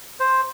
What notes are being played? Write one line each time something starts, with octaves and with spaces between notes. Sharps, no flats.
C5